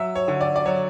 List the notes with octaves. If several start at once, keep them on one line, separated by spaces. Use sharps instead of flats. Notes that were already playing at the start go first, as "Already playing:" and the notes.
Already playing: F#3 E5
C#5
D3
D5
D5
F#3 C#5